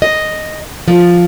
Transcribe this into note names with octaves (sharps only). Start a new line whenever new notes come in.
D#5
F3